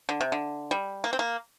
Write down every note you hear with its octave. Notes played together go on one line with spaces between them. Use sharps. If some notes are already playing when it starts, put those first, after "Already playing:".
D3
C3
D3
G3
A#3
C4
A#3